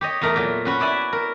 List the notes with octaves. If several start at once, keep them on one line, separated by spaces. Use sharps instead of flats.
G4 C#5 D#5
E2 A3 A#4
A#2 F#3
C#4 F#4 B4
E4 D5 E5 G#5
A#4